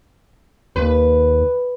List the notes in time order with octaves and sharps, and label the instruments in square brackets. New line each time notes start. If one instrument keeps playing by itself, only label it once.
[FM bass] D#2 [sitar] B4